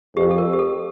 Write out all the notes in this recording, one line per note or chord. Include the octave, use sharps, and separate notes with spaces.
F2 G4
A4
A#4
G4
A4